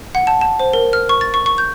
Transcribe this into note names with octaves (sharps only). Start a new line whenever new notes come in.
F#5
A5
A5
C5
A#4
F6
C#6
A6
C#6
C#6
G6